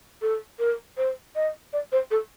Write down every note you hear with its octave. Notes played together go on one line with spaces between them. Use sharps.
A4
A#4
C5
D#5
D5
C5
A4